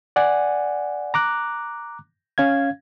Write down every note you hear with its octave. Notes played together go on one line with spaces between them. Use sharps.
D5 F#5 G#5
A#5 D6 F#6
C#4 F5 G#6